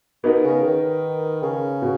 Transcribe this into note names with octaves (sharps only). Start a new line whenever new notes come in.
B2 B3 D#4 A#4
C#3
D#3
C#3
B2